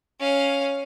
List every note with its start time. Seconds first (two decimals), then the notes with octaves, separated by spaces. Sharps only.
0.20 C#4 F5